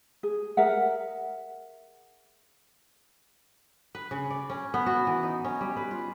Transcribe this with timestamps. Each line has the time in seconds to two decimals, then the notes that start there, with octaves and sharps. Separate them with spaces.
0.23 G#4
0.57 G#4 A#4 E5 F#5
3.95 B4
4.11 C#3
4.30 D5
4.50 C#4
4.74 B3
4.86 F#4
5.07 E3
5.23 D#4
5.45 C#4
5.61 G3
5.76 B4
5.91 F4